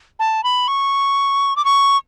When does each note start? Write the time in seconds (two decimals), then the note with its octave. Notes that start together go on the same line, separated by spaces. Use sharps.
0.19 A5
0.44 B5
0.68 C#6
1.56 D6
1.65 C#6